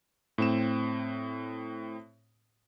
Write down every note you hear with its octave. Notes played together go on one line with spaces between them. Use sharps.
A2 C4 E7